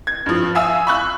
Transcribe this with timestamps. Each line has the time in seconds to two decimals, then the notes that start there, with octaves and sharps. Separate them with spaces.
0.07 G#6
0.26 G2 F3
0.55 E5 F5 G#5 D#6 E6
0.87 B5 C#6 F#6